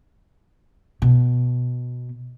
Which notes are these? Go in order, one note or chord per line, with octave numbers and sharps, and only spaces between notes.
B2